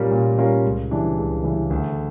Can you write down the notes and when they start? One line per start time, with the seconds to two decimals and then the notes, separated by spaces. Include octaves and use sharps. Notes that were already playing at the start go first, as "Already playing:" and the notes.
Already playing: A#2 G3 C#4 F4 A#4
0.12 A#2
0.38 G3 C#4 F4 A#4
0.64 C#2
0.91 C#3 E3 G3 D4
1.18 C#2
1.44 C#3 E3 G3 D4
1.70 D2